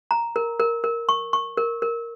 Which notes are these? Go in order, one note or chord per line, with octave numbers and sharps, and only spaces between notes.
A#5
A#4
A#4
A#4
C#6
C#6
A#4
A#4